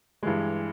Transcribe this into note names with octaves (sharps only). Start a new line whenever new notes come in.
G2 E3 G#3